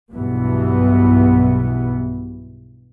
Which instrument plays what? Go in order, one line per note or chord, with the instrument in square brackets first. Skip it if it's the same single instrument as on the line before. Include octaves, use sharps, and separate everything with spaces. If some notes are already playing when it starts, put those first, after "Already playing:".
[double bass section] B1 G2 B2 E3 B3